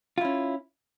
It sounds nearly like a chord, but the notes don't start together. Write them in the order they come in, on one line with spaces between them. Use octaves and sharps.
F4 E4 C#4